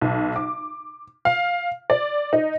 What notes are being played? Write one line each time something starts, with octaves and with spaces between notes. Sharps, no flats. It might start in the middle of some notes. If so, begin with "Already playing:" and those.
B1
D6
F5
D5
D#4